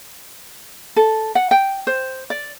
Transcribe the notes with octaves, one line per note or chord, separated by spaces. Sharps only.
A4
F#5
G5
C5
D5